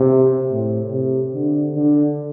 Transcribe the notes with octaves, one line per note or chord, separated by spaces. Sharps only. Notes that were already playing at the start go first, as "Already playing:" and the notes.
Already playing: C3
A2
C3
D3
D3